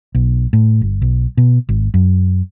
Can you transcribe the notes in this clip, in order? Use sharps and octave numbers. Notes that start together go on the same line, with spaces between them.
B1
A2
G1
B1
B2
G#1
F#2